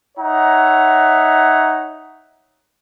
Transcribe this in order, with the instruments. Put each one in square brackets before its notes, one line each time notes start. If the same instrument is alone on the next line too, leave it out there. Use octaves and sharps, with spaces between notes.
[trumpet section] D#4 C#5 E5 F#5 A#5